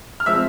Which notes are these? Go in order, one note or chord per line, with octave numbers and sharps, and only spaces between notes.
F6
F3 G#3 C4 E5 E6